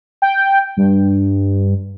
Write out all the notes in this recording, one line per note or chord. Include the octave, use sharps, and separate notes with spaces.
G5
G2